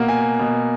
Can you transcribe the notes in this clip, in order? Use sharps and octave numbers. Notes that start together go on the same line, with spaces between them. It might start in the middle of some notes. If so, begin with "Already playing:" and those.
Already playing: B2 A#3 F#5
G#5
B2